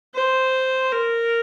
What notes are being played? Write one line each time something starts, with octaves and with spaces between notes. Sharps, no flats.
C5
A#4